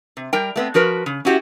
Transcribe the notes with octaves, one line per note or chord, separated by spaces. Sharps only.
C3
G3 A#4 G5
A3 B3 C4
F3 F#4 A#4 B4
C#3
C#4 E4 F#4 G4